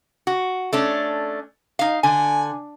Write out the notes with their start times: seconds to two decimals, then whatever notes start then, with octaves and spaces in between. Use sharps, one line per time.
0.27 F#4
0.73 A3 C#4 D4
1.79 D#4 F5
2.03 D3 G#5